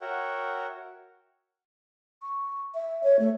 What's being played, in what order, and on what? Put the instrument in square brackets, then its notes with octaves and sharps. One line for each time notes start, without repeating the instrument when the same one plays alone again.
[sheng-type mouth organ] F#4 A#4 C#5 E5 F#5 G5
[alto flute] C#6
E5
C#5
A3